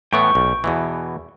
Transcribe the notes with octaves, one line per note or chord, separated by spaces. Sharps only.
A2 E3 B3 G5 C#6
B1
E2 B2 E3